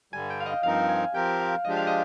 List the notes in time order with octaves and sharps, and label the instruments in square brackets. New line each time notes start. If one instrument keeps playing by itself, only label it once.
[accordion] G2 D3 G3 [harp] G#5
[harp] G5
F5
D#5
[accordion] G2 F3 C4 D#4 A#4 [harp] F5
[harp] G#5
[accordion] F3 C4 G4 A#4 [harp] G5
[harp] F5
[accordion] F3 G#3 D4 G4 [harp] D#5
[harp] F5
D#5